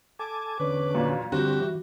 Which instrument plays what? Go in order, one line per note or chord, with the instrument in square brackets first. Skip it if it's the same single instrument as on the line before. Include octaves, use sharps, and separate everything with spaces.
[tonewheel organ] A4 G#5 [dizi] D6
[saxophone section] E2 D4 B4 [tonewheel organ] D3 C#4
[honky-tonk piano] F#2 A#2
[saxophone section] G2 F3 G3 [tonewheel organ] D3 C4 [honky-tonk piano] F#4 [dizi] G4
[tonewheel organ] E3